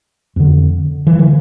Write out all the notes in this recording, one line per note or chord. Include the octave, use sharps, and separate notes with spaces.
F2 D3
E3
D3 F3